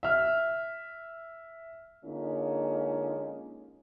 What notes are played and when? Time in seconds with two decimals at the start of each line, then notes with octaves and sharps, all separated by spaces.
0.03 E5 F6
2.04 D3 G#3 A#3 C#4 D#4 F4